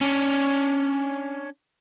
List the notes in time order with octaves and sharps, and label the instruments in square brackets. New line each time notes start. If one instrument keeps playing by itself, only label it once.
[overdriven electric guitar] C#4 D4